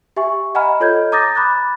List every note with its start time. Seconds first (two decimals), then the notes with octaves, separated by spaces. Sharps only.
0.16 G4 E5 G#5 C#6
0.55 D#5 F#5 G#5 A#5 B5 F6
0.80 F4 A4 C#5 D#5 G6 G#6
1.12 A#5 D6 D#6 G6 A6 A#6
1.35 B5 D6 F#6 A6